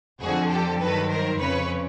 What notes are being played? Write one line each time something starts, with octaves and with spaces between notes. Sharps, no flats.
F2 D3 F3 F#4 G#4
G4 A4
G2 D#3 F#3 A4 B4
A#4 C5
F2 C#3 F3 B4 C#5